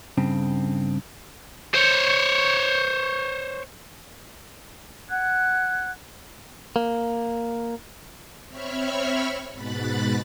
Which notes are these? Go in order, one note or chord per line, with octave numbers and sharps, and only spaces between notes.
G2 C#3 C4
C5 C#5
F#5 F#6 G#6
A#3
C4 C#5 E5 B5 C#6 F6
G#2 B2 B5 F#6 A6